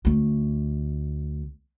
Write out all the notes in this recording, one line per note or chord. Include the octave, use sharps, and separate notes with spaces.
D2 A3